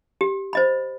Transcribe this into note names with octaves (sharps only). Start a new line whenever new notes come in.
G4
C5 D#5 B5